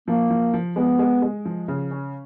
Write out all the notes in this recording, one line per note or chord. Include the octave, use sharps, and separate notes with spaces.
F3 A#3
F3
F3
G#3 B3
G#3
G#3
F3
C#3
C#4